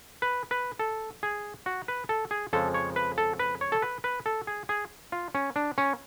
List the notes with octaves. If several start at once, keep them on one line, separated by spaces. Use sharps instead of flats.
B4
B4
A4
G#4
F#4
B4
A4
G#4
F2 C#3 F3 G#3 A4
C#5
B4
A4
B4
C#5
A4
B4
B4
A4
G#4
G#4
F4
C#4
D4
C#4